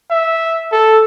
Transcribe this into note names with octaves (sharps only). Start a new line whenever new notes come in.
E5
A4